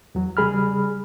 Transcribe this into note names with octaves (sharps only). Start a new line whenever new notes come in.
E2 F#3
C#3 G3 G#4 B5 F6